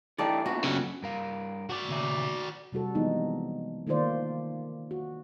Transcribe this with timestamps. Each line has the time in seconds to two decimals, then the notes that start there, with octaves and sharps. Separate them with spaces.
0.18 E3 A3 D4 D#4 G4 D5
0.46 A#2 D3 B3 F#4
0.64 C#3 F#3
1.02 G2 A#4 F5
1.70 F#4 D5
1.89 A#2 C#3 E5
2.72 C3 G3 F#4 A4
2.95 E3 F3 G#3 B3 D#4
3.87 D#3 A3 A#3 F4 C5 D5
4.91 F#4